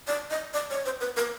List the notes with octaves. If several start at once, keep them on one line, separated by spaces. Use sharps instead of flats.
D5
D#5
D5
C#5
C5
B4
A#4